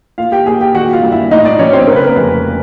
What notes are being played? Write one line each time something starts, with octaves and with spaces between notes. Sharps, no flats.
A#2 F4 F5
G4 G5
A#2 G#4 G#5
G4 G5
D#3 F#4 F#5
F4 F5
G2
E4 E5
A2 D#4 D#5
D4 D5
F#3 C#4 C#5
C4 C5
C#3 A#4
B4
A#3 A#4
F1